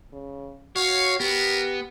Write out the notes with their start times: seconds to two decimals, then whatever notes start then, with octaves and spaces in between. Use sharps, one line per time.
0.12 C#3
0.76 F#4 C#5 F5
1.20 B3 G4 A#4